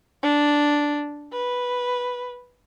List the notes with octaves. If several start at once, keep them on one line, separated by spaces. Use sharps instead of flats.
D4
B4